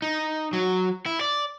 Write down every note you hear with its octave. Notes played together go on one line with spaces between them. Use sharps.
D#4
F#3
E4
D5